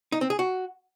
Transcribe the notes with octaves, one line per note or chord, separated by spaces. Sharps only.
D#4
C4
G#4
F#4